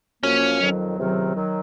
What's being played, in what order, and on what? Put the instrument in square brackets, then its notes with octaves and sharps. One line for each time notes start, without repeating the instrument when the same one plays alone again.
[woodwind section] F#2 F3 A#3 [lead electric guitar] C#4
[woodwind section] F2 D#3 F#3
C#2 C3 D#3 F#3
D#3 F#3